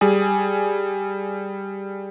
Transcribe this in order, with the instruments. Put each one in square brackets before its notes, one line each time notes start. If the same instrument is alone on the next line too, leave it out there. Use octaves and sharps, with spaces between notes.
[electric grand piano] G3 G#4 G#5